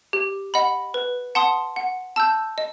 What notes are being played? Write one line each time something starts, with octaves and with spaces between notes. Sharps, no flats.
G4
D#5 F#5 B5
B4
F#5 A5 C6 D#6
F#5
A5 E6 G6
D#5